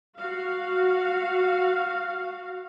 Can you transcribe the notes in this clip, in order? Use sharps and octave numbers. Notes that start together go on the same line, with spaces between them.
F#4 F5